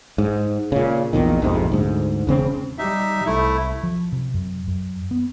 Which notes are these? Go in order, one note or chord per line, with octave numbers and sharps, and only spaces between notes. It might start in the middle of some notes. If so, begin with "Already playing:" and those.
G#2
A#2 C#3
A#1 E2 A#2 D#3
A#1 F2 G#2 C3
D2 G#2
E1 C#3 C4
G3 D#4 E5
C2 A3 E4
F3
C3
F#2
F#2
B3